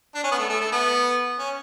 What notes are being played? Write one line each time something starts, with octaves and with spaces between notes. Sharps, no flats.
D4
C#4
B3
A3
A3
A3
B3
C#4